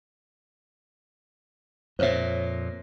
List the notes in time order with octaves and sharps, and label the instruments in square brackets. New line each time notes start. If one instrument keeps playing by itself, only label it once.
[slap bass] F2 A#2 [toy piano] C5 C#5 E5